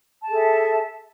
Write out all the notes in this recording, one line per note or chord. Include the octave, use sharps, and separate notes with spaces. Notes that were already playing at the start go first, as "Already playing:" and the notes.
G#4 A4 E5 A5